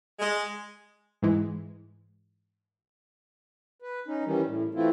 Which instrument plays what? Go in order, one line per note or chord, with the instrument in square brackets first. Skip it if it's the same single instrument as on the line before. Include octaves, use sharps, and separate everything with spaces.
[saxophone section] G#3
[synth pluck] G#2 E3 G#3
[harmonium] B4
C#4 D#4
D#3 E3 G3 C#4
A2
E3 A3 C4 E4 F4